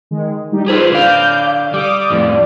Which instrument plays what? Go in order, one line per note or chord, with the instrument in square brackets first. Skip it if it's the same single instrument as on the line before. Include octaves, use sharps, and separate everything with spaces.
[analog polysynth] D#3 G#3
G3 D#4 G4
[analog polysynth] F3 C5 [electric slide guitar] G4 G#4 B4
[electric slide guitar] D3 F5 [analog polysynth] D6 G6
[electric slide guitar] G3 [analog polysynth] D6 D#6
[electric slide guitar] F2 A2 G3 [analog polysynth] D5